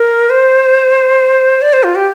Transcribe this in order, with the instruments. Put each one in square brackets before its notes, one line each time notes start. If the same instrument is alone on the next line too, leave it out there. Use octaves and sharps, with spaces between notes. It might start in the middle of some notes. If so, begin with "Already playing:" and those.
Already playing: [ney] A#4
C5
D5
C5
F4
G4